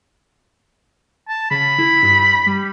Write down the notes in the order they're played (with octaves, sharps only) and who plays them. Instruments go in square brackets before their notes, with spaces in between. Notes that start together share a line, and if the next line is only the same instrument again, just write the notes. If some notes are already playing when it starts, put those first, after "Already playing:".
[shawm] A5
[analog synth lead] C#3 [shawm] B5
[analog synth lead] E4
G2
G3